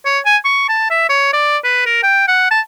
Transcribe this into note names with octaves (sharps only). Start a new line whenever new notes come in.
C#5
G#5
C#6
A5
E5
C#5
D5
B4
A#4
G5
F#5
A5